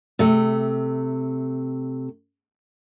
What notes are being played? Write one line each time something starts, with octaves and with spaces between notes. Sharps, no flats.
C3 A3